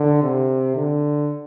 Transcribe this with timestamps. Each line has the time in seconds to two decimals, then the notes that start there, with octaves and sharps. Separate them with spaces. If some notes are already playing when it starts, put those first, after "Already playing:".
Already playing: D3
0.23 C3
0.76 D3